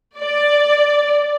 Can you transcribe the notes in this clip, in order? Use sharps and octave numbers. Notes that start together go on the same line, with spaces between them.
D5